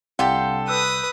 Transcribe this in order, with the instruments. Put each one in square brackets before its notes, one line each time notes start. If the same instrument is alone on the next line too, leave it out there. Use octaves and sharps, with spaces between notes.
[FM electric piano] C2 D4 G6 [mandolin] G4 A4 [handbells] F5 F#5 C6
[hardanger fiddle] B4 D#6 [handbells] E6 F#6